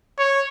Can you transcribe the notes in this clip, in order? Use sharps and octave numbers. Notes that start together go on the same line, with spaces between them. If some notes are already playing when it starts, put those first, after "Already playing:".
C#5